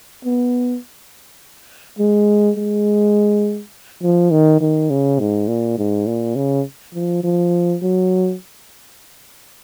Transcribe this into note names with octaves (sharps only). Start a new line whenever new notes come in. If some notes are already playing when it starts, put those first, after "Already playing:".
B3
G#3
G#3
F3
D#3
D#3
C#3
G#2
A#2
G#2
A#2
C#3
F3
F3
F#3